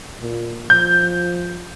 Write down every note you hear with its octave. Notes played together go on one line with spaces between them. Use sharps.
A#2
F3 G6